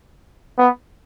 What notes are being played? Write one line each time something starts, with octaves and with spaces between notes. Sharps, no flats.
B3